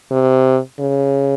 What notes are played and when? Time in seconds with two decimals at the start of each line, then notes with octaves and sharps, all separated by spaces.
0.11 C3
0.80 C#3